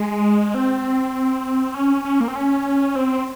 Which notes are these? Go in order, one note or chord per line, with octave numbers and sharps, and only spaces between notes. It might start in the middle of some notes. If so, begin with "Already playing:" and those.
Already playing: G#3
C4
C#4
C#4
A#3
C4
C#4
C4